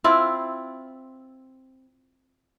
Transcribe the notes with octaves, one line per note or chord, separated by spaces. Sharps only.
C4 E4 F4